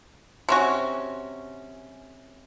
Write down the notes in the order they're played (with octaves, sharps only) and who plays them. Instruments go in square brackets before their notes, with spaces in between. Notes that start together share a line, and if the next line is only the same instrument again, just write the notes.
[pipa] C3 C#4 F#4